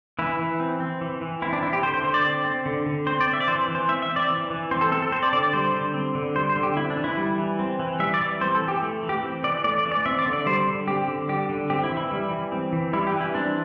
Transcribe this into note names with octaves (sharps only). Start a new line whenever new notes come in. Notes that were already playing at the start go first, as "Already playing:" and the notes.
E3 E4
E3
C4
C4
E3
E3
C4 E4
D4
C4 E4
G4
D3 C5
C5
D3 C5
D5
C4
C4
D3
D3
C4 C5
D5
C4
E5
D5
E3 C5
E3
C5
C4 E5
E5
C4
D5
E3
E3
C4 C5
A4
C4 A4
A4
C4 C5
D5
D3 D5
D5
G3 C5
D3
C4
D3
G3 C5
C5
D3
G4
C4 E4
D4
E3
E4
G3
E3
C4
E3
G3 E5
D5
E3
C4 C5
A4
E3
G4
A3
E3
G4
C4
E3 D5
A3 D5
D5
E3
D5
C4 E5
D5
D3
D5
G3 C5
D3
C4 G4
D3
G3 G4
D3
C4 G4
E4
E3
E4
G3
E3
C4
E3
G3 E4
G4
E3
E4
C4 D4